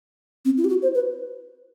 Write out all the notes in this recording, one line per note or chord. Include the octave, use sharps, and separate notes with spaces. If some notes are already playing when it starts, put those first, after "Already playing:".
C4
E4
G4
F#4
C5
B4